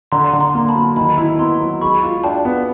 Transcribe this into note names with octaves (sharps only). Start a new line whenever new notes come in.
D3 A#5 C6
D3
A#5 C6
A#3
A5 B5
F#3
D#3 A5 B5
E4
B3 A#5 C6
F#3
G#3 B5 C#6
F4
D4 G5 A5
B3